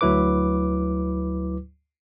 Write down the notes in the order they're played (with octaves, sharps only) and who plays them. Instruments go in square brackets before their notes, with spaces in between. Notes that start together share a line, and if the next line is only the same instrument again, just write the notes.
[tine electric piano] D2 F#3 E4 B4 D6